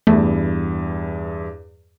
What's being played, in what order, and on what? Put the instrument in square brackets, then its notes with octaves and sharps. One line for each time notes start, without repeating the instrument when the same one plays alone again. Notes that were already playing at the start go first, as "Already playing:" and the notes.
[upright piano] E2 G2 [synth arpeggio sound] A3